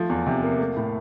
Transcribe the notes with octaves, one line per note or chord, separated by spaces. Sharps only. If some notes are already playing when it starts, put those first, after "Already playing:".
Already playing: F3 A3
E2
C3
A#3
A3
A2